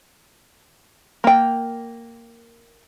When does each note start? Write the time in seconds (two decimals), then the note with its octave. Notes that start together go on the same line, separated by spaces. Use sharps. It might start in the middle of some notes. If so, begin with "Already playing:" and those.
1.24 A#3 G5